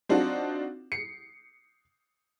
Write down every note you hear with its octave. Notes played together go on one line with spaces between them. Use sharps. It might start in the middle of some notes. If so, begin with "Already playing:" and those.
C4 D4 D#4 F4 F#4
C7 C#7